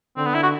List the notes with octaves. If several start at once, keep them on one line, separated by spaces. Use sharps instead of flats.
D3 C4
B3
E4
F#4